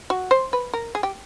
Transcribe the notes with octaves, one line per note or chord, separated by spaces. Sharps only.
F#4
C5
B4
A#4
G#4
G4